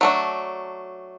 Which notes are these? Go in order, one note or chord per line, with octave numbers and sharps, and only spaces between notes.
F#3 A3 D4